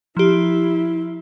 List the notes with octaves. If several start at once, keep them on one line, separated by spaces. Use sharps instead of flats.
F3 E4 G4